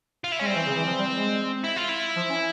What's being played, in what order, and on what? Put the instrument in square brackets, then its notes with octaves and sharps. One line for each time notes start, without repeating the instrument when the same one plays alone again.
[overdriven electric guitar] F4
E4
[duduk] G#3 [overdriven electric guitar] C#4
[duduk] G3 [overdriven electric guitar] C4
[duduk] E3
C#3
E3
F3
G3
G#3
[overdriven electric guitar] E4
F4
E4
[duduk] F3
C#4